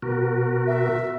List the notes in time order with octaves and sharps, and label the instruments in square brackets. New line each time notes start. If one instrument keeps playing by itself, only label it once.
[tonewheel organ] B2 F#4 A#4
[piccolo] E5